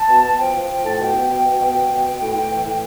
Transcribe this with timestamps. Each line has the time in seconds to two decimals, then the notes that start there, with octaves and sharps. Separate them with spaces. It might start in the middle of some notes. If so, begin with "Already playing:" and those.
Already playing: A5
0.08 B2
0.23 B2
0.37 F3 G5
0.53 F3
0.68 F3
0.84 A2 A5
0.98 B2 G5
1.13 B2
1.29 B2
1.44 B2
1.58 B2 G5
1.73 B2
1.89 B2
2.05 B2
2.20 A2
2.34 A2
2.50 E3
2.64 A2